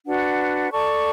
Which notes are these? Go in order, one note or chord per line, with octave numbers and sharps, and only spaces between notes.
D4 F#4 B4 F#5
A4 D5 A5 C#6